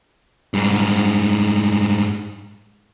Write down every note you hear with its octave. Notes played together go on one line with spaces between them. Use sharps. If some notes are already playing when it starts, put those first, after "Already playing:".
G#2 G3